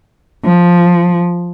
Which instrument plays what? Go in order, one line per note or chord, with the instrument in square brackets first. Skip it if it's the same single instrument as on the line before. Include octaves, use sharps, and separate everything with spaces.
[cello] F3